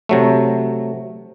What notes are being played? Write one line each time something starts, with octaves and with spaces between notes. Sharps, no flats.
C3 F#3 A3